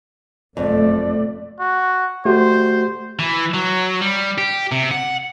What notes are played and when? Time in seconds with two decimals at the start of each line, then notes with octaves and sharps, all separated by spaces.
0.57 F#1 F2 B2 A3 D5
1.60 F#4
2.25 A3 F#4 G4 C5
3.19 E3
3.54 F#3
4.02 G3
4.38 G4
4.72 C3
4.92 F#5